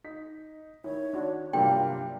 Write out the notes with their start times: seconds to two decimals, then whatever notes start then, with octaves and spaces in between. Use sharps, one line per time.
0.04 D#4 B6
0.84 D#3 E4 C#5
1.13 D4 F#4
1.53 G2 C3 F#3 A#3 D4 F4 G4 G5